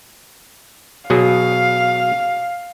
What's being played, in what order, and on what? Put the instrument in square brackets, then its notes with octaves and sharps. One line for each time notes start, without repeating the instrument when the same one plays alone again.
[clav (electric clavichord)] B2 F#3 G#4 [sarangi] F5